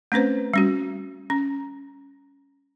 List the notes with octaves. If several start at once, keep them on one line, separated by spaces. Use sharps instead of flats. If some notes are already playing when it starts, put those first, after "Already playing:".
A3 C4 C#4 B4 C5
G3 C#4 F#4
C#4